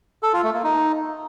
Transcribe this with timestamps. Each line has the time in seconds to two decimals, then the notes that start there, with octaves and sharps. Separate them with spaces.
0.23 A4
0.33 F4
0.43 A3
0.54 A#3
0.64 D#4